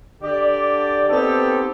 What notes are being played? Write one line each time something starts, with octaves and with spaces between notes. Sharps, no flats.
D3 G4 D5
B3 C4 D#4 G4 A4 C5